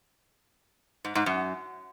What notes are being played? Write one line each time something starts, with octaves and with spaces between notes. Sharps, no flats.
G#2
G#2
F#2